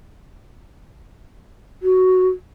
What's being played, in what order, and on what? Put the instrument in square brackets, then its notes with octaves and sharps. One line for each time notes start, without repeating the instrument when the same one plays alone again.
[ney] F#4